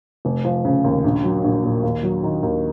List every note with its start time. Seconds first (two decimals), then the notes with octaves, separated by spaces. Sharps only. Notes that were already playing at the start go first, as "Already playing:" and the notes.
0.25 F1
0.45 F3
0.65 C#3
0.84 D#2
1.04 A#1
1.24 F#3
1.44 A#1
1.64 A#2
1.83 D#2
2.03 F#3
2.23 D#3
2.43 D#2